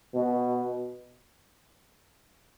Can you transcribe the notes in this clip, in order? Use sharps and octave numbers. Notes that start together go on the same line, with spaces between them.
B2